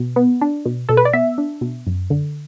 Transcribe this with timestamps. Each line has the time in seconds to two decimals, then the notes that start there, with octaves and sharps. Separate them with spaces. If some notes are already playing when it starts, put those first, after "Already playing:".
Already playing: B2
0.16 B3
0.41 D4
0.65 B2
0.89 B2 A4
0.97 B4
1.05 D5
1.13 B3 E5
1.38 D4
1.61 B2
1.87 F#2
2.10 D3